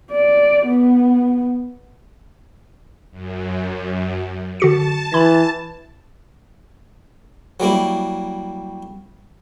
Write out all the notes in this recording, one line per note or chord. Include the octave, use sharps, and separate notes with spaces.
D5
B3
F#2
D3 F#4 A5 C#7
E3 B5 G#6
F#3 G3 A#3 E4